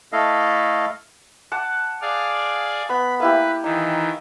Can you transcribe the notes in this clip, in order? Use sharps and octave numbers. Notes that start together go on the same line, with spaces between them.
A3 E4 A4 D#5 F5
F#5 A5 D6
G#4 D5 F5
B3 B5
A#3 E4 G4 B4
D#3 E3 D#4